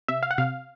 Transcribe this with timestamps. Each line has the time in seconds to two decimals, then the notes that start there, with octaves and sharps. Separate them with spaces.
0.08 C3 E5
0.23 F5
0.31 F#5
0.38 C3 F5